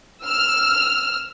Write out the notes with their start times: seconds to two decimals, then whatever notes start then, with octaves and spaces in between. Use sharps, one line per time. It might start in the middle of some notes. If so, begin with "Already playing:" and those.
0.24 E6 F6